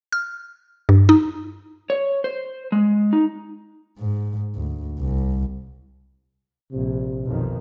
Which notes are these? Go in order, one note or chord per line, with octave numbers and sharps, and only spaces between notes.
F6
G2
D#4
C#5
C5
G#3
D#4
G#2
D2
C2
A#1 C3
B1 F2 D#3